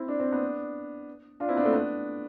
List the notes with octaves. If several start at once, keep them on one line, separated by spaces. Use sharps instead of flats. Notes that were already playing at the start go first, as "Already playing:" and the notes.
Already playing: C4 E4
D4
C4
B3 D4
D4 F4
C4 E4
B3 D4
A3 C4
B3 D4